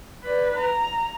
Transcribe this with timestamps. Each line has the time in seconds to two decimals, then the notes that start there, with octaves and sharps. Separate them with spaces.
0.24 B4 D5
0.57 A#5